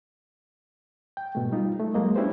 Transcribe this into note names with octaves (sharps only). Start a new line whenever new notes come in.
G5
G#2 B2 A3
G3 D#4 F4
A3
F#3 G#3 A#3 D#5
C#4 D4 E4 G4 B4 C5